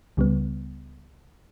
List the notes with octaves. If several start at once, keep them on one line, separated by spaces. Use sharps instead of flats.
C#2 C#3 G3 B3